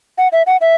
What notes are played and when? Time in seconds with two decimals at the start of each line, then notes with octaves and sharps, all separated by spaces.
0.18 F#5
0.32 E5
0.47 F#5
0.61 E5